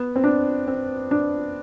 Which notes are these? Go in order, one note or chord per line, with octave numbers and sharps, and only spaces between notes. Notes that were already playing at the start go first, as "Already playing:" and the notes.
Already playing: B3
C4
D4
C4
D4